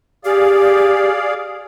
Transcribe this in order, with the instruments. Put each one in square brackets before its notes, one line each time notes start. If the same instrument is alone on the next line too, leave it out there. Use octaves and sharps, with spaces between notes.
[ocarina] G4 [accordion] G#4 D5 F5